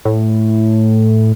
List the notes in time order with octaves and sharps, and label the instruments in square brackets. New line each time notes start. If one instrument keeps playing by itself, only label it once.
[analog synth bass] A2